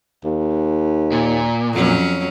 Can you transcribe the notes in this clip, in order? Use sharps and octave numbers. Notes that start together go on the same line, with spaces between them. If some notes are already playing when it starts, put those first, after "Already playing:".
D#2
A#2
F2 F#3 C#4